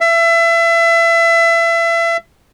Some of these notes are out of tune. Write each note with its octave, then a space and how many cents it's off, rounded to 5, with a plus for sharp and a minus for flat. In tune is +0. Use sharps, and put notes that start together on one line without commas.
E5 +30